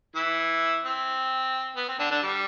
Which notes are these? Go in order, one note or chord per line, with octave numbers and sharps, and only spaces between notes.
E3 E4
C4
B3
C4
D3 D4
D3 D4
G3